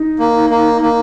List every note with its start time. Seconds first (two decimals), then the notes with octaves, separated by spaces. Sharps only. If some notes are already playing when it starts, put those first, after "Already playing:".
Already playing: D#4
0.19 A#3
0.50 A#3
0.82 A#3